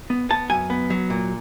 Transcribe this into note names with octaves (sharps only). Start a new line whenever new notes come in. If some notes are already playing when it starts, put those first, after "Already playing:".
B3
B3 A5
F#2 G#5
B3
F#3
A#2